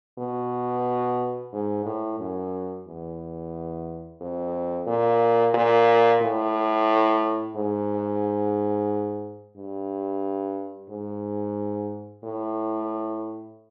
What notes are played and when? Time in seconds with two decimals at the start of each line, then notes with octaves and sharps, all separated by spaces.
0.19 B2
1.53 G#2
1.85 A2
2.20 F#2
2.87 E2
4.21 F2
4.87 A#2
5.54 A#2
6.22 A2
7.56 G#2
9.56 G2
10.90 G#2
12.24 A2